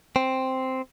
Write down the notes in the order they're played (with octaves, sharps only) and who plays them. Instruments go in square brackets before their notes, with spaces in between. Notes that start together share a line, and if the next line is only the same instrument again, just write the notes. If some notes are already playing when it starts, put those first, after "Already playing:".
[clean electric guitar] C4